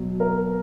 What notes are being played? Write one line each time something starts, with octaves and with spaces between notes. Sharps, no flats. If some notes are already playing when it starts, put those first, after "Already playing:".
Already playing: B2 F#3
A#4